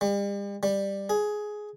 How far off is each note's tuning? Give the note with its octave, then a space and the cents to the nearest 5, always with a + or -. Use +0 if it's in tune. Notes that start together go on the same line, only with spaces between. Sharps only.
G3 +40
G3 +10
G#4 +10